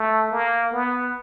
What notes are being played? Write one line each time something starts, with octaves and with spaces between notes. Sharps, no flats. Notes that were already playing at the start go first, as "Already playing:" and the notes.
Already playing: A3
A#3
B3